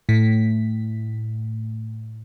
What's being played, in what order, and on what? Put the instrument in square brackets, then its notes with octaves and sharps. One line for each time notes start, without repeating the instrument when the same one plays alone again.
[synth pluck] A2 B6